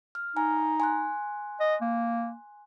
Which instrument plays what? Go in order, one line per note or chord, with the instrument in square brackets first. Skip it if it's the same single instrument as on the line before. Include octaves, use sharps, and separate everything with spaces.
[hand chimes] F6
[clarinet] D#4 [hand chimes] G#5
[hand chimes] G#5 C6 F#6
[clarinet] D#5
A#3